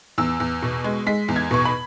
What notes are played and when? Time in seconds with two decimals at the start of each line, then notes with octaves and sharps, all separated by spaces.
0.18 E2 E6
0.40 E2
0.62 B2
0.84 G#3
1.07 G#3 B6
1.29 E2
1.36 G#6
1.51 B2 C#6
1.65 B5